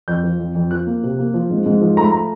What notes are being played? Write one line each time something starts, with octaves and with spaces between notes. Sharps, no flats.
F2 G6
F3
F2
F2
F3 F#6
A#3
C3
A#3
F3
G#2
G#2
F3
A3 A#5
B5
A#5